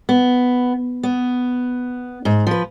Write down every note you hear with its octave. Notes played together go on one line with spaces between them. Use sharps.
B3
B3
G#2
F3 B4